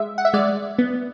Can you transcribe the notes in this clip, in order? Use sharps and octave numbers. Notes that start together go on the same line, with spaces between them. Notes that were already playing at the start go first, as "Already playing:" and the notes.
Already playing: G#3 E5
F#5
E5
G#3 D5
B3